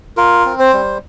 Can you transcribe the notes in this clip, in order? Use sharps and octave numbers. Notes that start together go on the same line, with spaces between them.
F4 A#4
C4
C5
G3